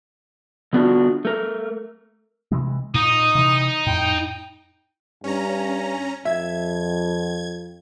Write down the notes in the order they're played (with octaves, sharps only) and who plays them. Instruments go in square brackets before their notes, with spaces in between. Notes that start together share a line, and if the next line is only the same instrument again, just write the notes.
[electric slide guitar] D3 B3 D4 F4 F#4
A3 A#4
[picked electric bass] C3 E3 G#3
[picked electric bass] A#2 [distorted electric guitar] D#4 [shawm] D#6
[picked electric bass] C3 E3
[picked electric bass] F2 A2 [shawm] G5
[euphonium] G2 [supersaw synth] C#4 A#5
[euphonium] F2 [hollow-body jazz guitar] E5 [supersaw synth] G#6